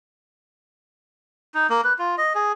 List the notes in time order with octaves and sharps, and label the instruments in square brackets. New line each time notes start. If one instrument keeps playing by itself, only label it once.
[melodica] D#4
A#3
B4
F4
D#5
G#4